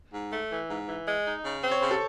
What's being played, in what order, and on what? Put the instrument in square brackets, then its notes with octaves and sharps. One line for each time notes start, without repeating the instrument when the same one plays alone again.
[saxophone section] G#2
A3
E3
G#2
E3
G#3
D#4
C#3
C4
[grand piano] C#5
[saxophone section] C#3 [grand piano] C5
[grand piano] A4